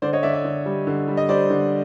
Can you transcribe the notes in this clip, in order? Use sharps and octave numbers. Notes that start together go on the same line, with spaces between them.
D3 C5 D5
C#5 D#5
D3 D5 E5
D5 E5
D3
G3
D3
G3
D#5
G3 C5 D5
D3